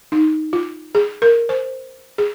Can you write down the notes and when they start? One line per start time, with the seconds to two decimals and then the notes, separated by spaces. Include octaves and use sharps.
0.12 D#4
0.53 F4
0.95 G#4
1.22 A#4
1.49 C5
2.18 G#4